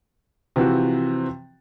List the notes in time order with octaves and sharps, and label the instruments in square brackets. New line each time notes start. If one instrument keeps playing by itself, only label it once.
[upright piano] C3 E3 F3 C4 F#4